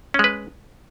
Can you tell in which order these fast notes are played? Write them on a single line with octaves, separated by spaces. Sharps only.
C#4 G#3 B4